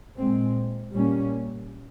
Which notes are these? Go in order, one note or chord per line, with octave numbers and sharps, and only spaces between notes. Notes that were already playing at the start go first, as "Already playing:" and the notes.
A#2 G#3 C4
A#2 G3 A#3 C#4